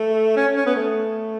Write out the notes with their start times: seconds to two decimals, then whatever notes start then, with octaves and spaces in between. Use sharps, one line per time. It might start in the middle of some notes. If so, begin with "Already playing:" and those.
Already playing: A3
0.36 C#4
0.56 C#4
0.66 B3
0.76 A3